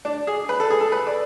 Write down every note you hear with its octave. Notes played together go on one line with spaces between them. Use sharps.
D4
G#4
B4
A4
G#4
A4
B4
D5